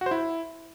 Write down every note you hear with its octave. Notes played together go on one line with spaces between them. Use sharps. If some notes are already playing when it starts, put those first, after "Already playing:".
F#4
C5
E4